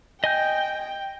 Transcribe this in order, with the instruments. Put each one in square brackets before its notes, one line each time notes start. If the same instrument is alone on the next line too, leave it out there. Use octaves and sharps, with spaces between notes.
[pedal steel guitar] D#5 G#5 G6 [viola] G5